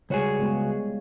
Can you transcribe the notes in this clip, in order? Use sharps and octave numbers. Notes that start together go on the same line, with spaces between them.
C#2 G3 F#4 G#4 C#5
G#3 B3 F4